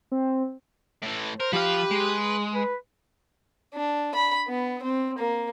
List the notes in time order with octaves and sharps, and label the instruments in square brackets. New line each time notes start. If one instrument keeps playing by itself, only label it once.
[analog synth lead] C4
[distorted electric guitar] A2 E3
[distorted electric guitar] A#4 [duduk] C5
[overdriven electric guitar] F3 F5 [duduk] G4 [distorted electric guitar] B4
[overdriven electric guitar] G#3
[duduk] B4
[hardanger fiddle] D4
B5
B3
C4
A#3